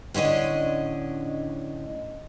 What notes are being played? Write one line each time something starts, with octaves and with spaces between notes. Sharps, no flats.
A2 D3 C#4 D4 D#5